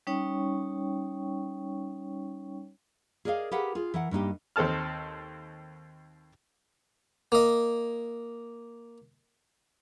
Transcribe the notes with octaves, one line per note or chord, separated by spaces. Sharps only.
G3 C#4 D#4 C#5 G5 C#6
G#4 A#4 D5 D#5 F5
G4 G#4 A#4 B4 F5 F#5
F4 G#4
E3 A#4 F#5
G2 A#3 D#4 G4
D#2 C4 A4 A5 F6
A#3 D#5